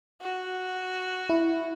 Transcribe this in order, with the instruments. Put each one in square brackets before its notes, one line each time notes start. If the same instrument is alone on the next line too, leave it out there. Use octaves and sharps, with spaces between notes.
[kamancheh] F#4
[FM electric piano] E4